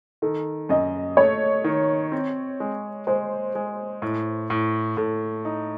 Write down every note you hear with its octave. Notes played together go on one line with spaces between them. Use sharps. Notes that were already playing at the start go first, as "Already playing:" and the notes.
D#3 A4
F#2 D#5
A3 C#5
D#3
C4
G#3
G#3 C5
G#3
A2
A2
A2 A4
D#4